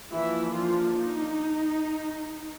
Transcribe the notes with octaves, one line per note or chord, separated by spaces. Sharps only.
E3 F3 A#3 D4 E4
F3 F4
D#4